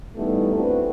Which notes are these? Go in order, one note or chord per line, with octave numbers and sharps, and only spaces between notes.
E3 G3 A3 B3 D#4 E4
A3 C4 D4 E4 F#4 B4